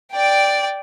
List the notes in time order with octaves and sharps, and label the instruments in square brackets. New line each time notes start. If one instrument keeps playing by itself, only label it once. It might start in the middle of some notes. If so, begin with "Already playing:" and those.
[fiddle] D5 G5